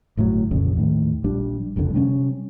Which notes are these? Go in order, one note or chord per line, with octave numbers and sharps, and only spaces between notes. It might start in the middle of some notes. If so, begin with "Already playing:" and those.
G1 A2 C3 F#3
D#1 A#1 F2 C#3
D#2 A2 D#3
A#1 G3 D4
F#1 C2 F2 D3
C3 G3 A3 C#4